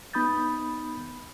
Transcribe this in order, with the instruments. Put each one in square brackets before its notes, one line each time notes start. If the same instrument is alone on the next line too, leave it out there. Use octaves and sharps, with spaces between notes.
[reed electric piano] B3 D#4 B5 D#6 G6 A6